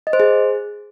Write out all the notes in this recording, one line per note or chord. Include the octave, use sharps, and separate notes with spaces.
D#5
C5
G#4